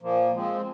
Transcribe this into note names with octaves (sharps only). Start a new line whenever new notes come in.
A#2 F3 A#3
F3 G#3 C4